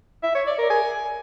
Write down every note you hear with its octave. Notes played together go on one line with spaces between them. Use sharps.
E5
C#5
D5
A#4
G#5